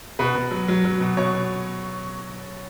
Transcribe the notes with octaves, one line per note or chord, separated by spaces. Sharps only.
B2 B4
B2
F#3
F#3
F#3
B2
B2 C#5
B2